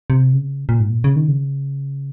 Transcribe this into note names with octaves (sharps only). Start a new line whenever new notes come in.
C3
C#3
A#2
G#2
A#2
C#3
D#3
C#3